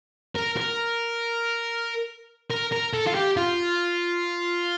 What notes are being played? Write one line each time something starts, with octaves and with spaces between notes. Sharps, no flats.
A#4
A#4
A#4
A#4
A4
F4
G4
F4